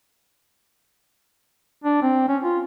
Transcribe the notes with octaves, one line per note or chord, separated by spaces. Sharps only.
D4
C4
C#4
F4